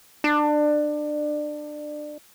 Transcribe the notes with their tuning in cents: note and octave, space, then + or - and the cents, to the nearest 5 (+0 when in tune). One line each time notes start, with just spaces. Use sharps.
D4 +25